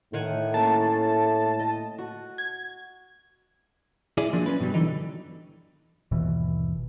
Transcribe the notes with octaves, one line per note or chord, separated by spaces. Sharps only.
A2 D#3 F#5 G#5
A#3 C#4 A5
D#5
F#4
G#6
E4 G#4 D5
F3 F#3 A#3 D4
C#4 B4
G2 B2 F#3 G3
D3 E3 D4 D#4
G1 D#2 B2 E3